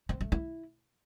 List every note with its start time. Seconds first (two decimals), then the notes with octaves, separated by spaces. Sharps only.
0.09 C4
0.21 A3
0.32 E4